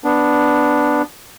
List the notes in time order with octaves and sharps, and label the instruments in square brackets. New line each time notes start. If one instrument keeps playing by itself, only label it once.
[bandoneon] B3 D4